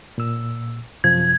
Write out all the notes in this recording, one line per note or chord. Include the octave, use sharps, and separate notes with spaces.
A#2 E6
F#2 C3 F3 G#6